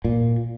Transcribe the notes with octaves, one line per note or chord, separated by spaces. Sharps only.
A#2